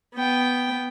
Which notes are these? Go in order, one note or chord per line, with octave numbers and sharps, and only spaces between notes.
B3 G5